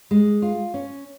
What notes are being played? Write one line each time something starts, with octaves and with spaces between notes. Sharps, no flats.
G#3
F4
C#4